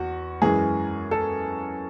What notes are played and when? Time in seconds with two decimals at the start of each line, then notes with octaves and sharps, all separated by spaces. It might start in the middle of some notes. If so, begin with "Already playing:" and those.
Already playing: E2 F#4
0.42 F#2 E3 G#3 G#4
1.11 A4